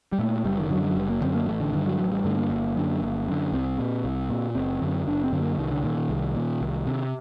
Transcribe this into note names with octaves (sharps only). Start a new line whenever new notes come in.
G3
A#2 A3
F#1 G3
D#3
F#2 D3 F#3
G3
F#3
F#1 G3
A#3
F#2 D3 C4
A#3
A1 A3
D3
G2 D3 D#3
F#3
A1 F#3
G3
G2 D3 A3
A#3
G1
F#2 D3
G1
F#2 D3
C2 C4
A#2
C2
A#2
F#1 C4
F#2 D3
F#1 D4
C4
F#2 D3
A#3
C2 D#3
D3
A#2 D#3
D#3
C2
A#2
C2
C3